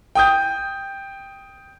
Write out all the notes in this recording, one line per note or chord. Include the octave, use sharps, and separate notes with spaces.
G5 D#6 G6